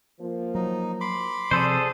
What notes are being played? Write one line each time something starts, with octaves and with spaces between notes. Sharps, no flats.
F3 A#3
F#3 D#4
B5 C6 D6
C3 F3 G#4 A4 C5 D5